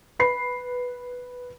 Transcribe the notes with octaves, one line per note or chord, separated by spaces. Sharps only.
B4 B5 C7